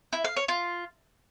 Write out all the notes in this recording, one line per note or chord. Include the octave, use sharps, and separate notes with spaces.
E4
F5
C#5
F4